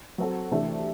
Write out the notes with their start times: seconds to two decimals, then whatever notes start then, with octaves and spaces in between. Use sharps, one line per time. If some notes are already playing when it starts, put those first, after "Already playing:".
0.18 F#3 C4 F#4 A4
0.51 C3 E3 A3 D4 A4